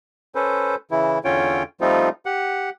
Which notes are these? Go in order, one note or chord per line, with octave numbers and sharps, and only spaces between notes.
C#4 A4 B4 C5
C#3 E3 E4
E2 D3 C#4 F4 C#5 G5
F3 G3 A3 C4 D#4 F4
G4 F#5